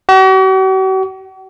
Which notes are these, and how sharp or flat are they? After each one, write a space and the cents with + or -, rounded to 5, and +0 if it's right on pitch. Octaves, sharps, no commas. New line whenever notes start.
F#4 +45